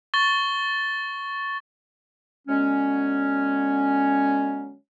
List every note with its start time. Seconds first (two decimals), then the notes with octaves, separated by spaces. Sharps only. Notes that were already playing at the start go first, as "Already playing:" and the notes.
0.14 C#6 A6 G7
2.48 D3 F#3 G#3 B3 C#4